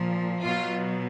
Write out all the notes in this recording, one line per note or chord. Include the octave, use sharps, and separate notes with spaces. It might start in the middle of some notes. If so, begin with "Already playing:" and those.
Already playing: A#2 F3
B2 F#3 F4